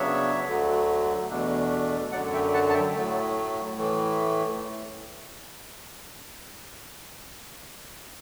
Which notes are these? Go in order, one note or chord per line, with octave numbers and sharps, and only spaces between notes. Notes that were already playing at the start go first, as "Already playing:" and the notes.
Already playing: C#3 F#3 B3 D4 C#5 E5
D2 D3 F#3 A3
E2 B2 A3 D4
F#2 D3 F#3 D5 F#5
E5 G5
F#5 A5
A5
E5 G5
A2 F#3 A3
A2 E3 A3